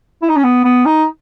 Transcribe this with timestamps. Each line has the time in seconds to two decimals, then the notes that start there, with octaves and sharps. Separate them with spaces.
0.22 E4
0.29 D#4
0.37 C#4
0.44 B3
0.64 B3
0.86 D#4